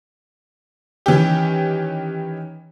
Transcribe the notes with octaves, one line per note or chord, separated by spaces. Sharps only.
D#3 E3 C#4 G4